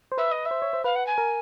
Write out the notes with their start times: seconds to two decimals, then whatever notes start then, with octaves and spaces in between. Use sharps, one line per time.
0.12 C5
0.18 B4 E5
0.31 D#5
0.45 E5
0.51 C5
0.62 C#5
0.73 C5
0.84 B4 F5
0.95 F#5
1.06 G#5
1.18 A#4